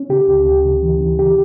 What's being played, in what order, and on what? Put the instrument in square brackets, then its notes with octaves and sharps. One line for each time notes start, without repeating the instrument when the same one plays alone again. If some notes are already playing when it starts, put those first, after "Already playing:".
Already playing: [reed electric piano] C#4
C#3 G4
D2
D2
C#3
E3
E3
C#3 G4